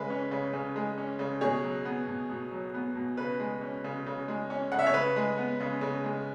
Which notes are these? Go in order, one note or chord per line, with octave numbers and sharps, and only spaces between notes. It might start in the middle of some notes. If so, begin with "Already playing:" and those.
Already playing: C#3 G#3 B4
C#4
C#3
C#3
G#3
C#4
C#3
B2 G#4 C#5
F#3
B3
B2
B2
F#3
B3
B2
C#3 B4
G#3
C#4
C#3
C#3
G#3
C#4
C#3 F#5
E5
C#5
C#3 B4
G#3
B3
C#3
C#3
G#3